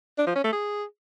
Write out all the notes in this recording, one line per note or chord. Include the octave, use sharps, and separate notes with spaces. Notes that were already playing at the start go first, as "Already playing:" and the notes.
D4
F3
C#4
A3
G#4